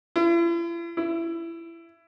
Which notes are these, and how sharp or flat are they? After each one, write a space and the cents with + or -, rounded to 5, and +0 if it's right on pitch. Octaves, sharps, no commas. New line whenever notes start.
E4 +45
E4 +20